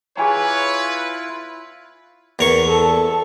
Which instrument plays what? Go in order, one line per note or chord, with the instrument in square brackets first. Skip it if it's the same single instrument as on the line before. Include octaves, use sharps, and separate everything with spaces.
[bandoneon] E4 F4 [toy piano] G#4 G#5 A#5 [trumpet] B4 [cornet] C#5
[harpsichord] E2 A#4 C#6
[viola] A4